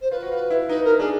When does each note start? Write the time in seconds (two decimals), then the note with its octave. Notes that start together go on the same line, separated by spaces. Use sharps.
0.01 C5
0.11 F4 B4
0.22 F#4
0.31 F4
0.50 E4
0.69 D#4 B4
0.84 A#4
0.99 D4 G#4